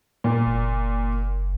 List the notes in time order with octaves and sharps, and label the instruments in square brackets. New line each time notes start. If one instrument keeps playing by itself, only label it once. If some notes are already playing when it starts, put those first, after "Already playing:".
[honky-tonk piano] A#2
[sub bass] F#1